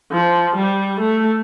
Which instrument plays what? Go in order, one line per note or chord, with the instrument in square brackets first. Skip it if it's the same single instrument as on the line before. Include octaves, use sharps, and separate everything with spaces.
[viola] F3
G3
A3